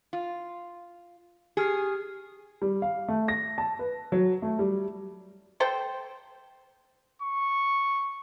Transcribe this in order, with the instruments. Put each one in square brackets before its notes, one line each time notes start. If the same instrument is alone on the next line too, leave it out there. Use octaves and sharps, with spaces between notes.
[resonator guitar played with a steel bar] F4
[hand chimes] G4 F6 C7 [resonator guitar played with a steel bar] G#4
[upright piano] G3
F5
A3
A#6
A5
B4
F#3
A3
G3
[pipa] A4 C5 G5
[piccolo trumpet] C#6